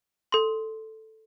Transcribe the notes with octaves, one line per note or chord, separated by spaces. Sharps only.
A4 C6